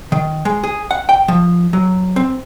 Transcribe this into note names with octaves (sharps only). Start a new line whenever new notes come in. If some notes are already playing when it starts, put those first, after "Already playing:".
D#3
G#3
G#4
F#5
G5
F3
F#3
C4